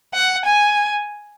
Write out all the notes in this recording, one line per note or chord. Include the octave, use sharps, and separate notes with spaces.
F#5
G#5